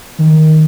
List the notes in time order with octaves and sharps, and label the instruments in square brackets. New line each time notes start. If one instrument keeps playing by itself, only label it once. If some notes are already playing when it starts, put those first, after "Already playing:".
[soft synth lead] D#3